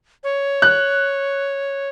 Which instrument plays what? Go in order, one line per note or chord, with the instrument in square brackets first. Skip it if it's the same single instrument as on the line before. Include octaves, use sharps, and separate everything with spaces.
[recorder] C#5
[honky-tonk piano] F#6